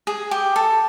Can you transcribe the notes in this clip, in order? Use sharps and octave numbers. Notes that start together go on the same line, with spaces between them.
G#4
G4
A4